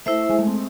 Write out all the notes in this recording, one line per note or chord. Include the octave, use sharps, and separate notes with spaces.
A3 E4 C5 E5
G#3
A3
C4